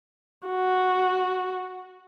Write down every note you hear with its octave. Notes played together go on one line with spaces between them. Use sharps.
F#4